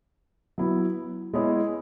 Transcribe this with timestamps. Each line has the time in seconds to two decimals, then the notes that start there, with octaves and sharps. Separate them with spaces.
0.58 F#3 B3 E4
1.33 G#3 B3 E4 G#4 C#5